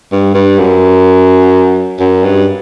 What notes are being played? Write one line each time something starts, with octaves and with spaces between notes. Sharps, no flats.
G2
G2
F#2
F#2
G2